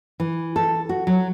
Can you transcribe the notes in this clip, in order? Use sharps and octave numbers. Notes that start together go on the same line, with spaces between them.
E3
A4
F#4
F#3